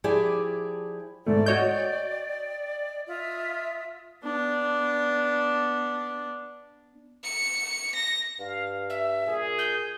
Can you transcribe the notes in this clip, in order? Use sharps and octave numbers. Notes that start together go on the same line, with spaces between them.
F3 E4 G4 G#4 D5
G#2 A3 D5 G5
F#4 C#5 D#5 G6
F4 E5 D#6
B3 D4
C#7
A#6
G2 F5
E5
A#2 G#4
G6